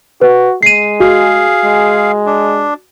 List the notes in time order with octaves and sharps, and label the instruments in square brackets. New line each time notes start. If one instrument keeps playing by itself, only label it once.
[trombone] F#4 [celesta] B4
[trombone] G#3 [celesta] C7 D#7
[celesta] F#4 [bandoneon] G#4 F5
[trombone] G#3
[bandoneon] D4